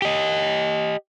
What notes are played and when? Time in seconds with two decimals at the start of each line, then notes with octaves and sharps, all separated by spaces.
0.02 G4 D#5